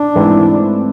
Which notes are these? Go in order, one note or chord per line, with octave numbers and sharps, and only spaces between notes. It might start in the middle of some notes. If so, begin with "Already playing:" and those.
Already playing: D4
G#2 E3 A3 C4 E4